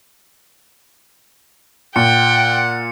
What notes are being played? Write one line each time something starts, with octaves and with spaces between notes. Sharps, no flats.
A#2 F#5 G5 C#7